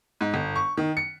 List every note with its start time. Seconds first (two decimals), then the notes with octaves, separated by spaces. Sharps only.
0.21 G#2
0.34 G1
0.56 C#6
0.77 D#3
0.97 C#7